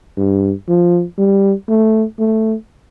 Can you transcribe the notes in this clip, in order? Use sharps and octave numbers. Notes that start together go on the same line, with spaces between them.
G2
F3
G3
A3
A3